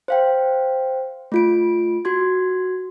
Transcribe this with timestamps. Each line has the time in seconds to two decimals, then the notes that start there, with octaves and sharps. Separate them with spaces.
0.08 C5 F5 G5
1.32 A3 F4 D7
2.05 F#4 C6 G#6